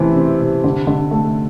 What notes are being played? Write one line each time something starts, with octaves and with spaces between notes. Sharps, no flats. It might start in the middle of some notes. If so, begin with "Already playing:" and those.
Already playing: C3 E3 A3 C4
C4
C3
D3
D3
A3